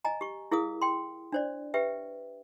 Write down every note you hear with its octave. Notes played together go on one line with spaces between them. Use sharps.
D#5 G#5 A#5
G4 C#6
E4 G#4 A#4 F5 D#6
G5 C6
D4 C5 D5
G4 B4 E5 G5